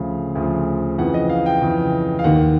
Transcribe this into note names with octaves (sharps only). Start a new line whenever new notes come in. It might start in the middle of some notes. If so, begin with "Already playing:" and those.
Already playing: D2 C#3 F3 F5
D2 C#3 F3
F2 C#3 E3 F#5
D#5
F5
G5
F2 C#3 E3
F5
D#2 D#3 F#5